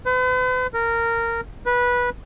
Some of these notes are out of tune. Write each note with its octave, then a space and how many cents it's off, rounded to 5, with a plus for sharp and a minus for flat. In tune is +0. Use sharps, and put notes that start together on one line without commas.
B4 +45
A#4 -15
B4 -15